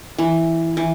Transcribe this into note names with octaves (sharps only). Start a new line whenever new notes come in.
E3
E3